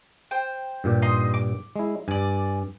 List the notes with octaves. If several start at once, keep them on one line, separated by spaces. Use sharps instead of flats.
C5 G5
G2 A#2 G4
D#4 D#5 C6
D6
G#3 E4
G2 D5 G#5